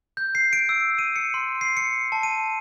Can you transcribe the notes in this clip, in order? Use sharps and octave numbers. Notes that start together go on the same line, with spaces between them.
G6
C7
D7
E6
D#7
C#7
C6
C7
C#7
A5
D#7